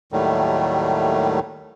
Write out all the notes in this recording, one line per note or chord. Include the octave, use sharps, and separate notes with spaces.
D#2 A2 D#3 F#3 G3 A3